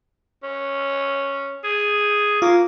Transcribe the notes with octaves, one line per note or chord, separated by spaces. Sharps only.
C#4
G#4
A#3 F4